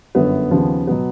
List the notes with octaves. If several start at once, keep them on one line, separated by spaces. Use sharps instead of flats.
G1 F#2 D3 B3
D#2 C#3 F3
B2 F#3 B3